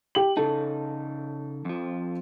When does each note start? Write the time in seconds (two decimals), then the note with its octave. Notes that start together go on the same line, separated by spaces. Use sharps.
0.15 G4 F#7
0.37 C#3 D#4 A4 A5
1.65 F2 F3